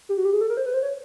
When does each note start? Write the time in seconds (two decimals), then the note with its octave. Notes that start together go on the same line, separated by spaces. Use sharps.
0.09 G4
0.17 F#4
0.25 G4
0.33 G#4
0.41 A4
0.50 A#4
0.57 C5
0.66 B4
0.74 C5
0.82 C#5